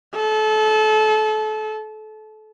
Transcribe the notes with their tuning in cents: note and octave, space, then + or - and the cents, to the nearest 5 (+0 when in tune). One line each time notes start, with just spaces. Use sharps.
A4 -30